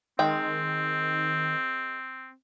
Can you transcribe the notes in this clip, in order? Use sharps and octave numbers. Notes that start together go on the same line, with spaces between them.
D#3 G#3 C4 G5